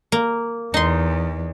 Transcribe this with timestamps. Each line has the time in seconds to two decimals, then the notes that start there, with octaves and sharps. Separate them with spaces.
0.12 A#3
0.74 E2 D#4 C6